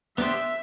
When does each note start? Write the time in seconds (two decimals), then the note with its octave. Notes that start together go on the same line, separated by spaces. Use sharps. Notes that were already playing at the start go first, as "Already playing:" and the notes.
0.18 B3 D4 G4 C5 E5